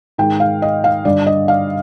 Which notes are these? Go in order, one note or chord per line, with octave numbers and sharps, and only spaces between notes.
G#2 D#3 G5
F5
D#5
F5
G2 D3 D5
D#5
F5